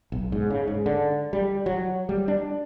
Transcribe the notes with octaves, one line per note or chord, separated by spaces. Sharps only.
B1
G#2
C#3
G#2
D3
G3
F#3
G3
D4